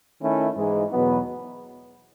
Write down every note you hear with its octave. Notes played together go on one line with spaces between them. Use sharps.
D#3 A3 C#4 E4
G#2 E3 G#3 D#4
E2 B2 F#3 B3